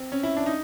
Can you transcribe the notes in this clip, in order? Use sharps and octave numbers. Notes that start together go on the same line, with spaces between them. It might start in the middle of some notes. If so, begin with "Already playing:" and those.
Already playing: C4
C#4
E4
D4
D#4